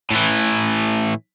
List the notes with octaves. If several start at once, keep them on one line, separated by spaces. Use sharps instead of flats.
A2 E3